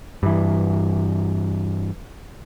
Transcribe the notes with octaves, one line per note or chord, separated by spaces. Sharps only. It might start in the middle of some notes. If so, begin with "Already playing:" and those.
G2 E3